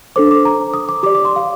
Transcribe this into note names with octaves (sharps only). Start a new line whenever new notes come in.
D4 A4 C5 D6
D6
A#5
D#6
D6
G4 D5 D6
D6
C6
F5